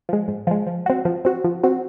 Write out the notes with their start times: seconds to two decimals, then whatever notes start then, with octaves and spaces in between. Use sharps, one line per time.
0.09 F3 G#3
0.28 G#2
0.47 F3 G#3
0.67 F3
0.86 C4 F#4
1.05 F3
1.25 C4 F#4
1.44 F3
1.63 C4 F#4